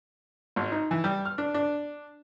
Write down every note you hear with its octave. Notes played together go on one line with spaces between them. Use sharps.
G#1
D#4
E3
G3
F6
D4
D4